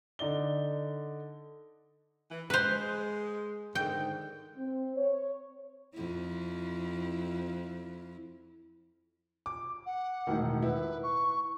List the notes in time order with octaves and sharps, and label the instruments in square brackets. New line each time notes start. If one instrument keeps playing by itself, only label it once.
[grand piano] D3 D#4 D5 G7
[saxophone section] E3
[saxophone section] G#3 [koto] B4 C5
[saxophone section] G#2 D3 D#3 [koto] G5
[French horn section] C4
C#5
[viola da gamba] F2 E4
[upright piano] D6
[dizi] F#5
[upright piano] E1 A2 D#3
[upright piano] E4 [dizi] B4
[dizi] C#6